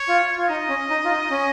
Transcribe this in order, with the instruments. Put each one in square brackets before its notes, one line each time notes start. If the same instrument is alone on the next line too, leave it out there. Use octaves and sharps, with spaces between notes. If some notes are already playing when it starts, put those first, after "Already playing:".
Already playing: [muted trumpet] C#5
[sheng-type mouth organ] F4
F4
[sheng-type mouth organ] D#4 [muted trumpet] D#5
[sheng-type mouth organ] C#4
D#4
F4
D#4
C#4